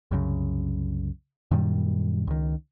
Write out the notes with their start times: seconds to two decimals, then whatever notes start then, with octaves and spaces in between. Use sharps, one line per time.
0.11 C2 F#2 C#3
1.51 F#2 A#2 D#3 G3
2.27 C#2 D#3